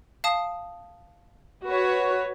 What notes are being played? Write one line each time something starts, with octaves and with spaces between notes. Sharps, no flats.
F5 A5 D#6
F#4 B4 C#5